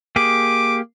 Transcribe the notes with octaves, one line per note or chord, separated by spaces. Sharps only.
A#3 G4 G#4 D6